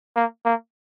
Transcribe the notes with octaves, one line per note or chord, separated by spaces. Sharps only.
A#3
A#3